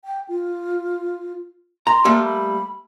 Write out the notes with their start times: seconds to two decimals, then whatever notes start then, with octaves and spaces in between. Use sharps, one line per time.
0.04 G5
0.29 F4
1.87 A#5 C6
2.05 G3 A3 A#3
2.25 B5